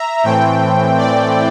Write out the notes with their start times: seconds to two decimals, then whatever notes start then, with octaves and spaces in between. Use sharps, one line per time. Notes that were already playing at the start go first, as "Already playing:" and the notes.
Already playing: E5 A#5
0.24 A2 E3 A3 C4 G5
0.98 D5